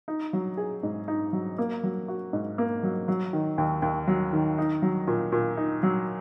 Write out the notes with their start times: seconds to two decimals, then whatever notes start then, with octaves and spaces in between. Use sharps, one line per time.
0.08 D#4
0.33 F#3
0.57 G#4
0.83 G#2
1.08 D#4
1.33 F#3
1.58 A#3
1.83 F#3
2.08 F#4
2.33 G#2
2.58 A#3
2.83 F#3
3.08 F#3
3.33 D#3
3.58 D#2
3.82 D#2
4.07 F#3
4.33 D#3
4.58 D#4
4.82 F#3
5.07 A#2
5.32 A#2
5.57 D#4
5.83 F#3